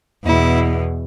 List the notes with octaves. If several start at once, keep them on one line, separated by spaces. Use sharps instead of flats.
E2 B2 E4